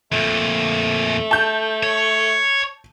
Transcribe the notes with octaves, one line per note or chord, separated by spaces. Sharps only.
F2 A#2 A3
A5 G6
C#5